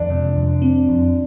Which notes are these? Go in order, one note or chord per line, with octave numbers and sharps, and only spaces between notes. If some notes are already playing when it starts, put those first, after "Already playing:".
Already playing: F2 D4
C3
F2
C4
F2